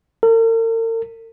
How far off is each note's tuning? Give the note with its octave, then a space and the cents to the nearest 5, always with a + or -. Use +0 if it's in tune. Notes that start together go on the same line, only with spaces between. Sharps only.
A#4 -45